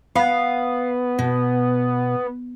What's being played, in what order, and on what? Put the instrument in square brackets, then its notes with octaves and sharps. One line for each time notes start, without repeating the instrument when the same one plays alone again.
[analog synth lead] B3 [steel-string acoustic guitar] F5
[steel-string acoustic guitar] B2